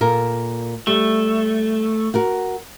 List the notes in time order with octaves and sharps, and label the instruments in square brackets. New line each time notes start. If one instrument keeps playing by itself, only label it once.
[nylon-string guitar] A#2 A4 A#4
[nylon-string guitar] G3 [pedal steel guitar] A3
[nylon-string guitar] F#4 A#4 F#5